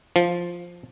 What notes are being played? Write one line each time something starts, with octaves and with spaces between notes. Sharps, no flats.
F3